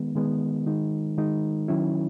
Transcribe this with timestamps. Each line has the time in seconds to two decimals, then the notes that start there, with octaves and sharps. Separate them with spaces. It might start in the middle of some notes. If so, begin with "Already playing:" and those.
Already playing: D#3 G#3 B3
0.15 D#3 G#3 B3
0.66 D#3 G#3 D#4
1.17 D#3 G#3 D#4
1.68 D#3 F#3 C#4 E4